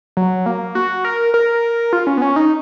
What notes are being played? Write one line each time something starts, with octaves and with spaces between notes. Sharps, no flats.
F#3
A#3
F#4
A#4
A#4
F4
C#4
B3
C#4
D#4